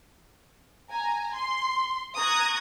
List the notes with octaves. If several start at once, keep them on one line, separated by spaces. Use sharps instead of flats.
G#5 A#5
C6
A#5 C#6 D#6 F#6 G#6 A#6